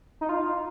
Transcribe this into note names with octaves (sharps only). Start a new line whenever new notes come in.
D#4
F4